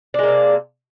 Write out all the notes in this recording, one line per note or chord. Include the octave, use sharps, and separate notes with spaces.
C3 G#3 A#3 D4